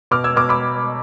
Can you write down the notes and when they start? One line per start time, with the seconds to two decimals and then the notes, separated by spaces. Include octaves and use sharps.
0.11 B2 D6 F6
0.24 E6 G#6
0.37 B2 D6 F6
0.49 B5 D6